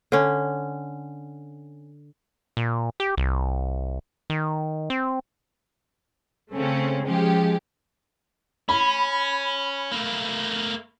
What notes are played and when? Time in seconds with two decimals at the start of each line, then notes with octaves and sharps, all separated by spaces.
0.12 D3 C#4
2.57 A#2
3.00 G4
3.17 C2
4.30 D#3
4.90 C4
6.52 C#3 A3 C4 C#4
7.05 F3 G#3 C#4 G4
8.69 C#4 B5
9.92 A3 A#3